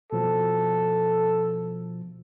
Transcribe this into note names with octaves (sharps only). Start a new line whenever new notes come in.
B2 F3 A4